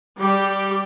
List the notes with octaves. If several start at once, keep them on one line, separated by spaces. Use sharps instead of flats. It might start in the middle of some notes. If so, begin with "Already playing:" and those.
G3 G4